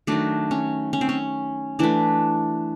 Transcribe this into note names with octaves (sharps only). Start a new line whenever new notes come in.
D#3 F#3 A3 D4
C#4
C#4
C4
C#4
E3 A3 D4